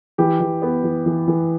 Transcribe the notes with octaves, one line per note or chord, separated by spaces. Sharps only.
E3 G4
E3
B3
E3
E3
E3